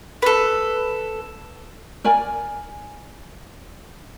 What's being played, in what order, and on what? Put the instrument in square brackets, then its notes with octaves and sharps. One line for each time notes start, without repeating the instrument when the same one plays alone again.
[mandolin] A4 B4
[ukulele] A#4 D5 G#5